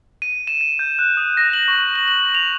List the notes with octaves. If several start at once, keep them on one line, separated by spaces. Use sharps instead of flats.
D#7
E7
E7
G6
F#6
D#6
A#6
F#7
C#6
F#7
F#7
F7